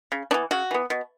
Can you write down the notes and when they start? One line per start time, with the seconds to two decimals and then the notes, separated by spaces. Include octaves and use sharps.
0.12 C#3
0.31 E3 B3 D4
0.51 C#3 F#4
0.71 E3 B3
0.90 B2